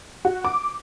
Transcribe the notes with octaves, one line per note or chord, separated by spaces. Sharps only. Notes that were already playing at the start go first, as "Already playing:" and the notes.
F#4
D6